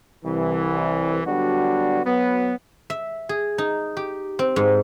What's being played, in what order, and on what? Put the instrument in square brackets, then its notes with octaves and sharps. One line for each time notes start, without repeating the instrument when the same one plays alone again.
[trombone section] C2 E3
D3 F#3 G3 B3 D4 F#4
F#3 B3
[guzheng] E5
G#4
D#4
G4
C4
G#2